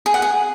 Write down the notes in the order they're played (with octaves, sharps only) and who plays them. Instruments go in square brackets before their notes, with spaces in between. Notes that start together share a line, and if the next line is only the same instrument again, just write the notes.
[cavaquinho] G#4
F#5
G#4